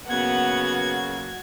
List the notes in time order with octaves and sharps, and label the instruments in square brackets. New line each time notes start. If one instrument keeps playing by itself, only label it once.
[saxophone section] C#3 F#3 A#3 [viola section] B3 F#5 [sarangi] F#4 [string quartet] G#6